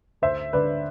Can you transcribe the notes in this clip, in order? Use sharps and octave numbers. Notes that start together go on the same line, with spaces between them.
D2 C5 E5
D3 B4 D5